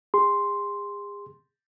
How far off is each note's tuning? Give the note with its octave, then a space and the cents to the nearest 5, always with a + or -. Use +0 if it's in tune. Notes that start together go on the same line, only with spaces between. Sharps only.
G#4 -40 C6 +0